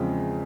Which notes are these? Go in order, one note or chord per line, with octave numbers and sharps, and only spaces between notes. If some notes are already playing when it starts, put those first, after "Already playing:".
Already playing: E2 C#3 F3 G#3 C4